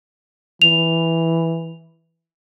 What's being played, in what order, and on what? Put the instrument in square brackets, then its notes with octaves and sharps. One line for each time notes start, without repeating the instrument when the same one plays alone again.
[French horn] E3 [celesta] F7